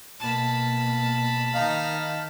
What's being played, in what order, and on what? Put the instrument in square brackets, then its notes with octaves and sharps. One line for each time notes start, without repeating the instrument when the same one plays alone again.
[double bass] B2 A#3 [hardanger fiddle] A5 B5
[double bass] D#3 [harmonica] D#4 F5